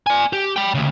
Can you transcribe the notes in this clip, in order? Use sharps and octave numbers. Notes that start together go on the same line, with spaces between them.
D5 G#5
G4
G5 B5
D2 C#3